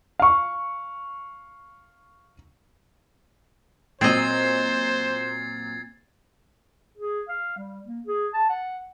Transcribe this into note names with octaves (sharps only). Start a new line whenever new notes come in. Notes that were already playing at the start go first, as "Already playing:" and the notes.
F5 C#6
A#2 F#3 C4 C5 D#5 G#6 A6 C7
G#4
F5
G3
A#3
G#4
A5
F#5